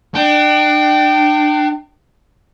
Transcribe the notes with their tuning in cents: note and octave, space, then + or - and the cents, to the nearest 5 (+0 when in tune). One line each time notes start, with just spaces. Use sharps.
D4 +30 G5 -15